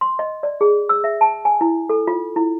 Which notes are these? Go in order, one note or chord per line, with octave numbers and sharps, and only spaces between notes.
C6
D#5
D5
G#4
E6
E5
A5
G#5
E4
A4
F4
E4